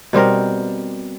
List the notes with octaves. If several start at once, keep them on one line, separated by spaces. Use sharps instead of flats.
B2 G3 C4 A#4